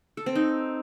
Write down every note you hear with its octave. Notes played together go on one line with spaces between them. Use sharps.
A4
C4
D#4